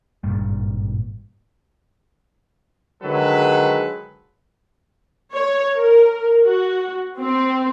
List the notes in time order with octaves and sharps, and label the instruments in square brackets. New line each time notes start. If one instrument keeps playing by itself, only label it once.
[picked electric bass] G#1 G2 A#2 G3
[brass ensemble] D3 D#3 F#3 G#3 A4 B4
[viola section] C#5
A#4
F#4
C4